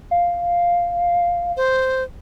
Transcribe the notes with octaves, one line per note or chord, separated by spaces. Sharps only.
F5
C5